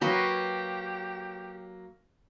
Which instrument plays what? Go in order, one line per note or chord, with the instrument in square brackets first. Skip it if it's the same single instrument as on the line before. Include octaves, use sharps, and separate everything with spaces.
[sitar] F#3 A#3 [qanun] F#4 B4 D#5 [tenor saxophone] G4